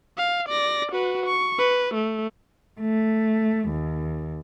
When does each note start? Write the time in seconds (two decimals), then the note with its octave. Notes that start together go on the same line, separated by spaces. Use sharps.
0.17 F5
0.49 D5 A#6
0.92 F#4 B4
1.26 C#6
1.59 B4
1.94 A3
2.80 A3
3.68 D#2